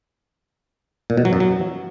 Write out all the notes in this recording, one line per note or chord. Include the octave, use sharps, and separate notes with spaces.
A#2
B2
F#3
F#2
F#3